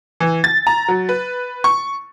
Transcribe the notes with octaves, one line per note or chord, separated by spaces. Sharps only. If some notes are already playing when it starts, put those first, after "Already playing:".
E3
A6
A#5
F#3
B4
C#6